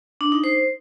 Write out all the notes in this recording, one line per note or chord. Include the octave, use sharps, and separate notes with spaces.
D4
D#4
C5